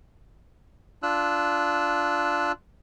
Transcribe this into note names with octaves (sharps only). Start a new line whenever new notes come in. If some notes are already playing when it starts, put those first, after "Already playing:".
D4 F4 E6 F#6